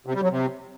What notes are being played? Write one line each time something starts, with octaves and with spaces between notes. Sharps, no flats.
C3
G3
F#3
C3